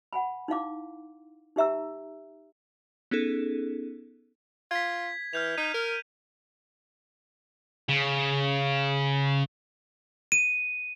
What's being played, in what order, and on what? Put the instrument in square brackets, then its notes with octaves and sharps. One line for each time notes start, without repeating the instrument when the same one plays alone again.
[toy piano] F#5 G#5 B5
D#4 E4 F5 D6
D#4 G4 E5 A#5 E6
[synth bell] B3 C#4 D#4 G#4 A4
[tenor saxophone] F4 [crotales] G#6 B6
[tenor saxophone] E3 [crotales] F6 G6 F7
[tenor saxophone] D#4 [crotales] D#7
[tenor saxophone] A#4
[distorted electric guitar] C#3
[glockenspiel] D#7